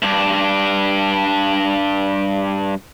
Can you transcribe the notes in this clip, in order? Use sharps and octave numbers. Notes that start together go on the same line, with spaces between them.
G2 D4